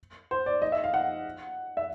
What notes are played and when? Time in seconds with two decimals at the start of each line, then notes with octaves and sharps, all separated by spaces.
0.31 C5
0.46 D5
0.62 D#5
0.72 E5
0.84 F5
0.94 F#5
1.77 E5